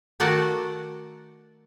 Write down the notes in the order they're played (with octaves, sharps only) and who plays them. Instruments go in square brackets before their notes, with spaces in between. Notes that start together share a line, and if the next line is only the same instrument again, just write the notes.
[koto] D#3 A3 F#4 D5 F#5 A5